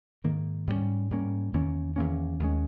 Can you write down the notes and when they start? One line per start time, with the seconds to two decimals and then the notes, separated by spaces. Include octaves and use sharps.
0.24 G#2 D#3 A#3
0.67 G#2 G3 A#3 C#4
1.11 G#2 G3 A#3 C#4
1.53 E2 D#3 A#3 C#4
1.96 E2 D#3 A#3 C#4
2.39 D#2 D#3 G#3 C#4